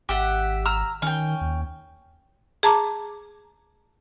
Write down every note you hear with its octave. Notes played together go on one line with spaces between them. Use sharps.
G#1 G4 E5 F#5
A#5 E6 F6
D#3 C#4 G5
D#2
G#4 A5 A#5 D6